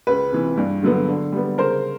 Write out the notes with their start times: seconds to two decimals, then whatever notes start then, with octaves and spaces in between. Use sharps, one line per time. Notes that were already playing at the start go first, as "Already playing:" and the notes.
0.07 C#2 B4
0.32 C3 E3
0.58 G2
0.83 D3 F#3 B3
1.08 D3
1.32 G3 B3
1.58 C#3 A#4 C5